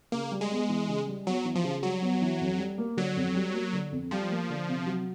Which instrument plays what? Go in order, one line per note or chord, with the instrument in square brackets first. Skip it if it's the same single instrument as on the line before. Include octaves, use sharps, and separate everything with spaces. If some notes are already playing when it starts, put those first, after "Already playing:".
[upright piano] C#3 [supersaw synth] A#3
[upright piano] G3
[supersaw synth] G#3
[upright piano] B3
E3
C#3
G3
[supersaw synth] F#3 [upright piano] B3
[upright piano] E3
[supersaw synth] F3
[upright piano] C#3
[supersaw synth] F#3 [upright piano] G3
[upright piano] B3
E3
F2
G3
A#3
[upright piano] D3 [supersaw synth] F#3
[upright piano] F2
G3
A#3
D3
F2
[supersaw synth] F3 [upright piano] G3
[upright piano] A#3
D3
C3
F#3